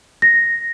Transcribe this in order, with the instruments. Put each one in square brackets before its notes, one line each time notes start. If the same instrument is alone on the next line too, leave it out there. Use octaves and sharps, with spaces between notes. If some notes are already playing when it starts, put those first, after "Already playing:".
[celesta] A#6